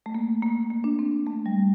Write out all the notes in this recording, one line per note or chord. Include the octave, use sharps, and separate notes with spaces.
A3
A#3
A#3
A#3
D4
C4
A3
G3